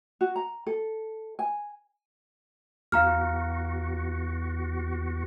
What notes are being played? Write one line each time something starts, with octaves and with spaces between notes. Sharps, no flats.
F#4
A#5
A4
G#5
E2 F#4 F5 A#5 F6